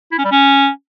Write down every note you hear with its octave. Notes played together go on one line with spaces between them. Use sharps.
E4
C#4
G3
C#4